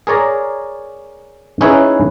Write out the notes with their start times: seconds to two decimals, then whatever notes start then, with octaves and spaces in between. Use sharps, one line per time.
0.07 G#4 A#4 C#5 D5 A#5
1.61 C#4 D#4 E4 G#4 B4 C#5